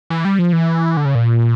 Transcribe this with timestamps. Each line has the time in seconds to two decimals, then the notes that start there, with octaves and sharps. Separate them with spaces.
0.10 E3
0.25 G3
0.39 F3
0.53 E3
0.97 D3
1.05 C#3
1.15 A#2